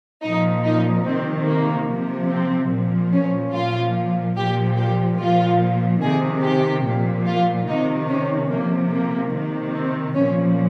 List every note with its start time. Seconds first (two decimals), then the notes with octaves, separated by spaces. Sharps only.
0.23 A#2 F3 D#4
0.64 D#4
1.06 C3 D#3 C4
1.46 A#3
1.88 C3 F3
2.29 C4
2.71 A#2 F3
3.12 C#4
3.53 A#2 F3 F4
4.37 A#2 F3 G4
4.77 G4
5.19 A#2 F3 F4
6.01 C3 D#3 G#4
6.43 G4
6.85 A#2 F3
7.26 F4
7.67 C3 D#3 D#4
8.09 C#4
8.50 C3 F3 A#3
8.90 A#3
9.32 C3 D#3
9.74 C4
10.14 A#2 F3 C#4